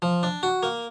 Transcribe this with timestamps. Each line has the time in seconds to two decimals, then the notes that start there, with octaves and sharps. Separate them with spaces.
0.02 F3
0.23 D4
0.43 F#4
0.63 A#3